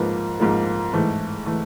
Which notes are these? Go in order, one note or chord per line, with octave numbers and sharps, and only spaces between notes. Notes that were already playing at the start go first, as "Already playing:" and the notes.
Already playing: G#2 F3 A#3 B4
G#2 F3 A#3
G#2 E3 A3
E3 A3